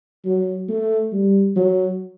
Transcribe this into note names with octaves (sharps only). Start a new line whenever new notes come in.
F#3
A3
G3
F#3